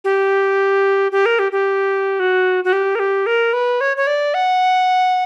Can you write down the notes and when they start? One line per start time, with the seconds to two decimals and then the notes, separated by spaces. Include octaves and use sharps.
0.04 G4
1.12 G4
1.26 A#4
1.39 G4
1.52 G4
2.20 F#4
2.64 F#4
2.73 G4
2.95 A#4
2.99 G4
3.26 A#4
3.53 B4
3.81 C#5
3.97 C#5
4.07 D5
4.34 F#5